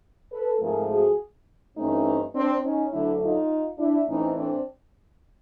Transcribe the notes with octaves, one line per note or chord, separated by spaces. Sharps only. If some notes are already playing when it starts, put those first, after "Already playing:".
A4 B4
G#2 F3 A3 C4 G#4 A#4
F#4 G#4
G2 E3 A3 C4 C#4 D#4
C4 D4
C#4 D#4
D2 D3 F#3 A3 D4 E4
D#4 F4
D4 E4
A2 E3 A3 C4 C#4 D#4
C4 D4